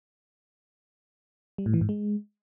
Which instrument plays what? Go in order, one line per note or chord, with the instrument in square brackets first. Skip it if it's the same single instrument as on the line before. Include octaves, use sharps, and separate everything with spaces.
[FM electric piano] G3
A2
E3
G#2
G#3